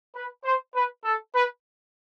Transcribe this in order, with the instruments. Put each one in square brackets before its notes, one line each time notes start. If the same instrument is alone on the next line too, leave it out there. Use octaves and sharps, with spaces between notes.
[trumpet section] B4
C5
B4
A4
B4